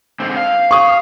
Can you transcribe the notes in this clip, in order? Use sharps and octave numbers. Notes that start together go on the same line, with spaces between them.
G#2 D3 C4
F5
C#6 D#6